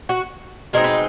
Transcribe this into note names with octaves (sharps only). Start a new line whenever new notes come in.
F#4
B2 G#3 C4 D#4 A#4
B4